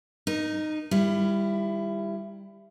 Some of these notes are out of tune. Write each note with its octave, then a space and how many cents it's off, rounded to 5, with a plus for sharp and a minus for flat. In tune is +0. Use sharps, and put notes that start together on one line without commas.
D#4 -15 A#4 +20
D#3 +0 G3 +20 E4 +25